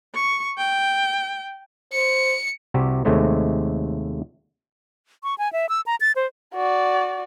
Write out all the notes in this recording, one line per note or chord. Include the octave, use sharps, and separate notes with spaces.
C#6
G5
C5 C#7
C2 C3 F#4 G4
D#2 C3 G#3 A3 C5 C#5
C#6
G#5
E5
E6
A#5
A6
C5
F#4 D5